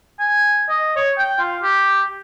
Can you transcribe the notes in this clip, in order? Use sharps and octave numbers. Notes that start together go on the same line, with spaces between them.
G#5
D#5
C#5
G5
F4
G4